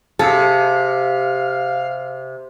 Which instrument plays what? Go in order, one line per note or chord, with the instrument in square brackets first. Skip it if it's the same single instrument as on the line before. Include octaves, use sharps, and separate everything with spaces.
[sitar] C3 [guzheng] G#4 [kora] A4 [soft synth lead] F5